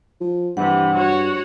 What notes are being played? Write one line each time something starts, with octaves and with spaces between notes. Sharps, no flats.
F3
G2 C3 E3 F#5
F#4 C#5